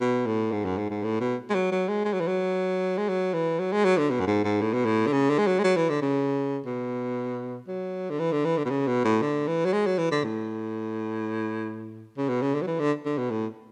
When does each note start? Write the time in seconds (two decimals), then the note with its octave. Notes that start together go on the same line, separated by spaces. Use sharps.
0.01 B2
0.27 A2
0.52 G#2
0.65 F#2
0.78 G#2
0.90 G#2
1.03 A2
1.20 B2
1.50 G#3
1.54 F#3
1.72 F#3
1.88 G#3
2.05 G#3
2.13 F#3
2.20 E3
2.28 F#3
2.98 G#3
3.08 F#3
3.34 E3
3.59 F#3
3.72 G#3
3.85 F#3
3.97 D3
4.10 B2
4.20 F#2
4.27 G#2
4.44 G#2
4.61 A2
4.73 B2
4.85 A2
5.07 D3
5.13 C#3
5.30 D3
5.38 G#3
5.46 F#3
5.59 G#3
5.64 F#3
5.76 E3
5.89 D3
6.02 C#3
6.66 B2
7.68 F#3
8.10 D3
8.19 E3
8.32 D3
8.45 E3
8.58 D3
8.65 B2
8.70 C#3
8.87 B2
9.05 A2
9.22 D3
9.47 E3
9.65 F#3
9.73 G#3
9.86 F#3
9.98 E3
10.11 D3
10.24 A2
12.17 C#3
12.29 B2
12.42 C#3
12.54 D3
12.62 F#3
12.67 E3
12.80 D3
13.06 D3
13.18 B2
13.31 A2